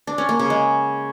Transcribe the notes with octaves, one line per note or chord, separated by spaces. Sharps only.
D4
C#4
A#3
C#3
G#3